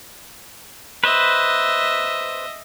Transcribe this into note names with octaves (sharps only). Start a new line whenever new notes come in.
B4 C5 D#5 E5